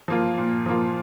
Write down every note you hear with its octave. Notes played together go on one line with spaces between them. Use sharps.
F3 A#3 F4
A#2
F3 A#3 F4